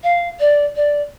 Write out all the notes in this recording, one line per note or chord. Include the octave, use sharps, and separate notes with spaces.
F5
D5
D5